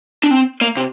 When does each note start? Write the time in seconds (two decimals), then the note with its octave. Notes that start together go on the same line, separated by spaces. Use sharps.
0.23 D4
0.31 C4
0.61 A#3
0.77 C3